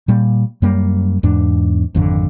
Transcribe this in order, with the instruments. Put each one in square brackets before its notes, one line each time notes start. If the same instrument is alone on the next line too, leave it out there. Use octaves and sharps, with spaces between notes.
[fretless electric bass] A#2 G3
F#2 G3 A#3
E2 G#2 D4
G#1 F2 D3